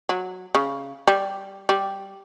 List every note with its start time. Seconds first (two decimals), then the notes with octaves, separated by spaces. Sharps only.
0.09 F#3
0.55 C#3
1.07 G3
1.69 G3